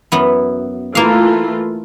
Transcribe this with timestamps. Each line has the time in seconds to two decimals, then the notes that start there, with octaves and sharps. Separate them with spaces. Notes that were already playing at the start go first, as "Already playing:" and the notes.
0.12 F#2 B3 E4
0.95 E3 A3 A#3 F4 F5